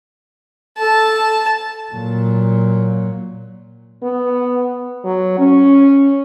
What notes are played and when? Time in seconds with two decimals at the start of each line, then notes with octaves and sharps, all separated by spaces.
0.78 A4 A5
1.93 A#2 F#3
4.03 B3
5.05 F#3
5.38 C#4